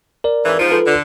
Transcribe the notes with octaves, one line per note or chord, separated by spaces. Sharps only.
A#4 D5
F2 G#2 E3
G#2 F3
F4 A4 B4
D3